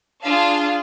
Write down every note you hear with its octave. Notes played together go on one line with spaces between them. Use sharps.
D4 F4 G#4 F5 A5